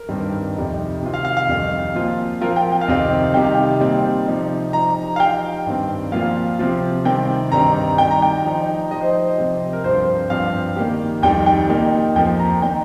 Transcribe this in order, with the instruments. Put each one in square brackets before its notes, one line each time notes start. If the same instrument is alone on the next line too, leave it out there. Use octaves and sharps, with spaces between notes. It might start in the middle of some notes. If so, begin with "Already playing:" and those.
Already playing: [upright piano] A#4
[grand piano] G2 D#3 G3 C4
F2 C3 G3 D#4 G4
C3 D#3 C4 F4
[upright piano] F5
F5
F5
[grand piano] F2 D#3 G3 D#4
A#2 F3 C4 F4
[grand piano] F3 C4 F4 [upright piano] A#4
[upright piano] G5
G5
F5
[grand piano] F2 C3 D#3 C4 G4 [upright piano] D#5
[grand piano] C3 D#3 G3 D#4 G4 [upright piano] G5
[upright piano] F5
G5
[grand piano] A#2 G3 C4 D#4
C3 F3 D#4 G4
[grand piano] F3 D#4 G4 [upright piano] A#5
[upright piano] F5
[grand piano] F3 D#4 G4 [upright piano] G5
[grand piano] G2 D#3 C4
[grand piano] A#2 F3 A#3 F4 [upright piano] F5
[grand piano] C3 F3 C4 F4
[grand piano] C3 D#3 G3 C4 [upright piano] G5
[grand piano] G2 D#3 C4 D#4 G4 [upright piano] A#5
[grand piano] D#3 G3 D#4 G4 [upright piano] G5
[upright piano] A#5
G5
[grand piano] F3 D#4 G4
[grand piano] F3 D#4 G4 [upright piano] D#5
[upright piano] C5
D#5
[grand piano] C3 F3 C4 G4
[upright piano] A#4
[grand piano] G2 F3 C4 F4 [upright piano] C5
[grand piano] G2 F3 C4 G4 [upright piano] F5
[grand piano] D#3 A#3 G4
[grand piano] F2 D#3 G3 D#4 [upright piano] G5
[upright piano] G5
[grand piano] A#2 A#3 D#4 G4
[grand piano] F2 F3 A#3 [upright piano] G5
[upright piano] A#5
[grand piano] D#3 A#3 D#4 [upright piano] G5